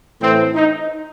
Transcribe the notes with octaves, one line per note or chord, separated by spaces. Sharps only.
A2 E3 A3 C4
D#4